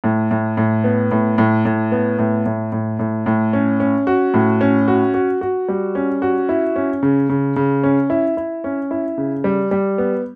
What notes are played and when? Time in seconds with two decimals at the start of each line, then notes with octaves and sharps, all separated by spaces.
0.04 A2
0.31 A2
0.57 A2
0.84 B3
1.11 A2
1.38 A2
1.65 A2
1.92 B3
2.19 A2
2.46 A2
2.72 A2
2.99 A2
3.26 A2
3.53 C#4
3.80 C#4
4.07 F#4
4.34 A2
4.61 C#4
4.88 F#4
5.14 F#4
5.41 F#4
5.68 G3
5.95 C#4
6.22 F#4
6.49 E4
6.76 C#4
7.03 C#3
7.29 C#3
7.56 C#3
7.83 C#4
8.10 E4
8.37 E4
8.64 C#4
8.91 E4
9.18 C#3
9.44 G3
9.71 G3
9.98 B3